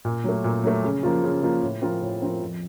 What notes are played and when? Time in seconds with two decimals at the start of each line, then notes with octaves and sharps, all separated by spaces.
0.05 A#2
0.24 F#3 A3
0.44 A#2
0.63 F#3 A3
0.84 C#3
1.03 F3 A#3 F4
1.24 C#3
1.43 F3 A#3 F4
1.63 A2
1.82 F3 C4 F4 A#4
2.02 A2
2.22 F3 C4 F4 A#4
2.41 F2